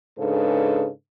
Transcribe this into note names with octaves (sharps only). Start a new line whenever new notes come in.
G#2 C#3 D4 A4 B4